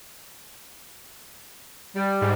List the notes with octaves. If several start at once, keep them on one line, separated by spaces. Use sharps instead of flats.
G3
G#2